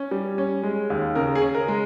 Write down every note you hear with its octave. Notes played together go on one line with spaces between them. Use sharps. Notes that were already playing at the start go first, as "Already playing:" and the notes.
Already playing: C#4
G3
C#4
G#3
D#2
C#3 A#4
G#4
C#4
A#4
G#3